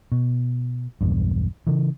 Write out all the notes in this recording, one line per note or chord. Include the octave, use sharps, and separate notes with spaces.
B2
B1 E2 G2
C#3 E3